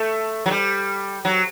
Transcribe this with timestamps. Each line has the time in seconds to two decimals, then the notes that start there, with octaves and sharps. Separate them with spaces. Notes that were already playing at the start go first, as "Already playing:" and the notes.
Already playing: A3
0.46 F#3
0.51 G3
1.25 F#3